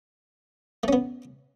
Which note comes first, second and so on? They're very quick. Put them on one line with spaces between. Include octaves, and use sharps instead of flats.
A3 C#4 B3